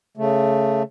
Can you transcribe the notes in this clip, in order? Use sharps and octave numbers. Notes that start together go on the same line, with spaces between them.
C#3 A3